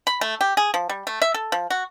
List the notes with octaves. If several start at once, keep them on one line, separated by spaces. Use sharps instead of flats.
B5
A3
G4
G#4
F3
G3
A3
E5
A4
F3
F#4